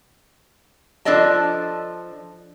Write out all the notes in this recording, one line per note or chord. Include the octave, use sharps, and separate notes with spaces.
F3 D4 A4 D5 D#5 A5